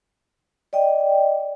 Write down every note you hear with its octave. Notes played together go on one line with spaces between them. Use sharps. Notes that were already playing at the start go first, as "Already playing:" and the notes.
D5 D#5 G5